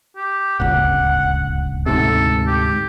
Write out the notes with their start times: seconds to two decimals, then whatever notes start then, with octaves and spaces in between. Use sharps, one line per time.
0.17 G4
0.60 D1 G1 C#2 F#5
1.86 D2 G#2 C3 A4
2.47 G4